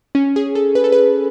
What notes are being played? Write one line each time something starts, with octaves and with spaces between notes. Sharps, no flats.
C#4
G#4
A4
B4
A4
B4